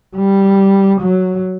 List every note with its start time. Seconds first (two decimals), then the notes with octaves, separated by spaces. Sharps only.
0.17 G3
1.00 F#3